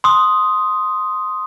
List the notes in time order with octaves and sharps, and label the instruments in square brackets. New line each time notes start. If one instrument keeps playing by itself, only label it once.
[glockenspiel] C6 D#6